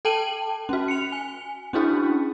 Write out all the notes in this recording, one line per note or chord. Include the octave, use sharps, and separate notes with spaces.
A4 G5 A5 D#7 F#7
C#4 F#4
C#7 F7
G#5
C#4 D4 E4 F#4 G#4